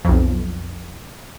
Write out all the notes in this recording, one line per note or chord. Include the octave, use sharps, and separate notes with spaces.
B1 F2